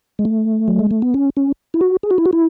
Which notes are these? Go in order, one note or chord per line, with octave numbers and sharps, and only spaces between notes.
G#3
A3
F#3
G#3
A3
B3
C#4
C#4
E4
F#4
G#4
F#4
E4
F#4
E4